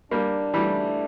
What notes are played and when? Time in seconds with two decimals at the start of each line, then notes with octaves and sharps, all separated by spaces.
0.11 G3 A#3 D4
0.54 E3 G3 A3